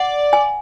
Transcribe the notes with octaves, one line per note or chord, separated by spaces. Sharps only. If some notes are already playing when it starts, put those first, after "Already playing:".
Already playing: D5 F#5
G#5